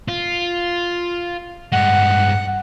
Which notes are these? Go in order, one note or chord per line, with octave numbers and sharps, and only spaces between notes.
F4
G2 G#3 F#5